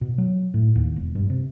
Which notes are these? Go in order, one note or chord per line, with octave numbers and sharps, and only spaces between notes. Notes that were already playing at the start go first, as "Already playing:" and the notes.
B2
F#3
A2
D#2
E1
G2
C3